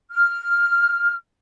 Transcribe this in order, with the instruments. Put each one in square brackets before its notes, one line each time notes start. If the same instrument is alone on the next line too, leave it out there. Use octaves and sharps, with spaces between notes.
[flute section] F6